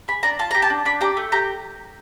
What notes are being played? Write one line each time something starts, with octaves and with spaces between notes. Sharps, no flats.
G#4 B5
D4 A#5
F4 A5
G4 A#5
A5
D4
D4 B5
G4 A#5
A3
G4 A#5